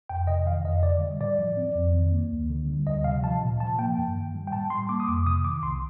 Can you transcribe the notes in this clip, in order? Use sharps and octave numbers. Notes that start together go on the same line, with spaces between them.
F2 G5
C3 D#5
D#3 F5
F2 D#5
D3 D5
G3
A2 D5
F3
C4
F2
D#3
A#3
D2
D3
G3
D2 D#5
C3 F5
F3 A5
A#2
F3 A5
A#3 G5
G2
D#3
G3
G5
A2 A5
G3 C6
A#3 D6
D#6
F2 D6
C3 D#6
D#3 D6
C2 C6